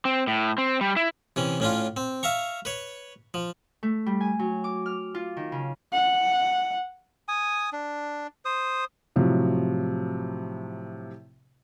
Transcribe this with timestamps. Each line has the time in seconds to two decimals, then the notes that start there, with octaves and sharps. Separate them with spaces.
0.05 C4
0.27 A2
0.58 C4
0.81 G3
0.96 E4
1.36 C3 E3 C#4
1.60 A2 C#4 D4 F4
1.97 C4
2.23 E5 F5 A#5 C#6
2.65 B4 C#5
3.34 F3
3.83 A3
4.06 G3
4.21 G#5
4.39 F#3
4.64 D6
4.86 F6
5.14 F4
5.37 D#3
5.52 C#3
5.93 F#5
7.28 G#5 D#6
7.73 D4
8.45 C5 D#6
9.16 A2 C3 F3 F#3